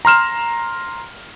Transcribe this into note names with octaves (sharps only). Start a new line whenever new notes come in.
A#5 C6 F6 E7